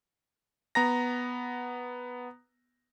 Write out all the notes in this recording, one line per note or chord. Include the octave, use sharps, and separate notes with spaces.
B3 A#5 A#6